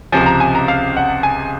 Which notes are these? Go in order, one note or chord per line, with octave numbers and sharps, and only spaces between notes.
C#2 C3 F3 G#5
A#5
G#5
A#5
F5
F#5
G#5